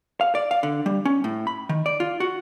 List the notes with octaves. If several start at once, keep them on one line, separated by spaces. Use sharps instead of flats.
F5
D5
F5
D3
G3
C#4
A2
B5
D#3
D5
F4
F#4